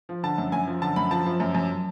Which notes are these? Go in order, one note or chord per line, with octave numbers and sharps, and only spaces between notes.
F3
D3 A5
F#2
F#2 G#5
F3
D3 A5
F#2 B5
F3 A5
F3
F#2
F#2